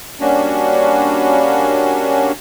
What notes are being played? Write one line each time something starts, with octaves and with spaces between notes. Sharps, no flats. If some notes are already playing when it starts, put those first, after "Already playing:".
G3 A#3 C#4 D4 F#4